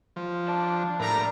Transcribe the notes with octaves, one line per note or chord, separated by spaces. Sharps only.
F3
D5 A5
A2 G3 A#4 A#5